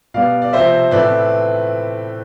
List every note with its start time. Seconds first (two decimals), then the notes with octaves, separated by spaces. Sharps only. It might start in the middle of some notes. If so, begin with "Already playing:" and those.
0.14 B2 G3 B3 D5 F5
0.42 D5
0.53 C3 F3 C4 C5 E5
0.91 A2 E3 A3 C4 B4 D5